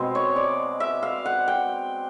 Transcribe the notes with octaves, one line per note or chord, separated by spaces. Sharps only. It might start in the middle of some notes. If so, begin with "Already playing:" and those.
Already playing: B2 G#3 C4
C#5
D5
E5
F5
F#5
G5